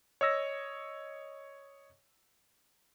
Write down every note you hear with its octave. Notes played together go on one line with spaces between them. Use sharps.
C#5 D#5 E6 A#6